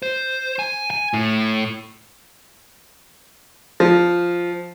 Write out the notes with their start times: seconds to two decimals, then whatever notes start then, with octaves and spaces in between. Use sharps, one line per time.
0.02 C5
0.59 G#5
0.90 G#5
1.13 A2
3.80 F3